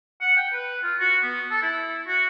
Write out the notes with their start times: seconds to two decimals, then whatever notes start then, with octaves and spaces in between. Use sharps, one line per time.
0.21 F#5
0.37 G5
0.53 B4
0.83 F4
1.00 F#4
1.23 B3
1.51 A4
1.62 E4
2.08 F#4